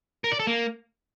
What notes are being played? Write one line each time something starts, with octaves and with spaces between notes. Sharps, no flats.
A#4
D5
A4
A#3